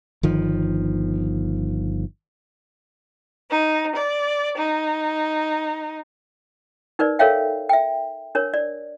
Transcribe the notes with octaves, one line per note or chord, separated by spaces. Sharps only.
G1 D#3 F3
D#4
D5
D#4
D#4 A#4 B4 D5
A4 A#4 C#5 E5 F5 G5
E5 G5
D4 A#4 C#5
D5